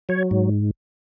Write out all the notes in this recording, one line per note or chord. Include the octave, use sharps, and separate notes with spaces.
F#3 C#5
G#2